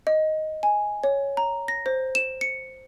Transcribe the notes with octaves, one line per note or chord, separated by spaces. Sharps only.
D#5
G#5
C#5
A#5
A#6
C5
E7
C#7